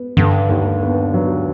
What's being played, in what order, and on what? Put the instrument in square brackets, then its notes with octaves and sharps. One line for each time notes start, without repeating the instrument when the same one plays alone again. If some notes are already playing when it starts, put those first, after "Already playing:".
Already playing: [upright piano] B3
[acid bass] G2 [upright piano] D3
[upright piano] D#2
B3
F#3